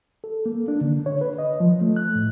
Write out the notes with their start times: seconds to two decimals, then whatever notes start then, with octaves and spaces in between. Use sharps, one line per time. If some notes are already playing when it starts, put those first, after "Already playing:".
0.24 A4
0.46 A#3
0.68 D4
0.81 D3
1.06 C#5
1.21 B4
1.38 D#5
1.60 F3
1.81 A3
1.96 F#6
2.15 A2